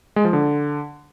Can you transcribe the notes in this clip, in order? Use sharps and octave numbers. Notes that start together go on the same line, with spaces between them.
G#3
F3
D3